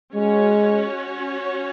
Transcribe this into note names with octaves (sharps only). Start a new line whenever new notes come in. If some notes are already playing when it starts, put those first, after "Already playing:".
G#3 C#4 F#4 C#5